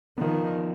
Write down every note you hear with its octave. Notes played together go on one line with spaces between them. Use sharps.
D#3 F3 B3